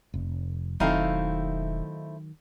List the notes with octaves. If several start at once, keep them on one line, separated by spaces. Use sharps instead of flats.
F1
E1 D#3 F#3 A3 C4 D#4 E4 F5